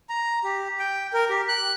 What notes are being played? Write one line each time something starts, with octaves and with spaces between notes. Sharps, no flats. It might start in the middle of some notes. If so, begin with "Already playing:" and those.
A#5
G4
G5
A#4
G4
F#6